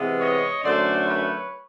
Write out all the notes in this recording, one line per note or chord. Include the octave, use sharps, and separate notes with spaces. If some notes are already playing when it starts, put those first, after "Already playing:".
Already playing: C3 E3 G#3 B3
C#5 D#5
F#2 D3 F#3 A3 C5 D5
B4 C#5